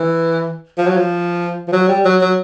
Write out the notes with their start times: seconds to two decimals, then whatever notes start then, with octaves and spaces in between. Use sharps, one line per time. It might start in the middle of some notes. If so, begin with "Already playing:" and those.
Already playing: E3
0.78 F3
0.87 F#3
0.97 F3
1.68 F3
1.72 F#3
1.88 G3
2.05 F#3
2.21 F#3